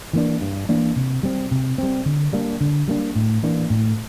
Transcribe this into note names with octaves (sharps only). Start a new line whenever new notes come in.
E3 A#3 D4
G2
E3 A#3 D4
C3
G3 C4
C3
G3 C4
D3
G3 A#3 D4
D3
G3 A#3 D4
A2
E3 A#3 D4
A2